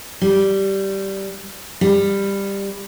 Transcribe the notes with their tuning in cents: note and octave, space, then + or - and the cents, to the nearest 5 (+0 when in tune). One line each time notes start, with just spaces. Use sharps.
G3 -10
G3 +15